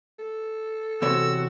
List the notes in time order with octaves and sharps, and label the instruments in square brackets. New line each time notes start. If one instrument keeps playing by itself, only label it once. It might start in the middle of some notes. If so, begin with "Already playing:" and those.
[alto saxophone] A4
[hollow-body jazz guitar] E2 C3 C#5 [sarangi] F#4 [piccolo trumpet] E6